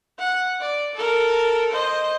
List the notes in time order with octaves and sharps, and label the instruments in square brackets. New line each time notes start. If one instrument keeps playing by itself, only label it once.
[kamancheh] F#5
D5
A4 A#4
C5 D#5